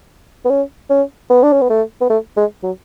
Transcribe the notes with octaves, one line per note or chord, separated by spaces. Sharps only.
B3
C#4
C#4
B3
D4
C#4
B3
A3
B3
A3
G#3
F#3